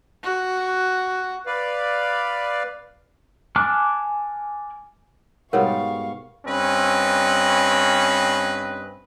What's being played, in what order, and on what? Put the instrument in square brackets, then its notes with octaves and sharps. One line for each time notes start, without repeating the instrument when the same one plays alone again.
[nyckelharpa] F#4
[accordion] B4 D5 F5
[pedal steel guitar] G#5 A5 D6 F6 F#6
[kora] G#2 B2 G3 [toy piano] A#4 C#5 F#5 [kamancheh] F5 C#6
[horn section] G2 C4 C#4 B4 D#5